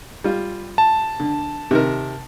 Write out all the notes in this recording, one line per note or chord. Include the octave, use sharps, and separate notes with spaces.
G3 F4
A5
D3
C3 D#3 A#4